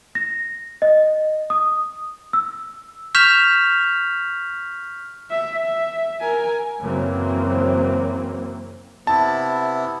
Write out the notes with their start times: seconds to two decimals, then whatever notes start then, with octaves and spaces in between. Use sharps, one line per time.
0.15 A#6
0.82 D#5
1.50 D#6
2.33 E6
3.15 C#6 F6 G6 B6 E7 F7
5.30 E5
5.65 E5
6.20 A#4 G#5
6.80 F#2 C#3 E3 F#3 A#3 C4
9.07 C3 B3 E4 A5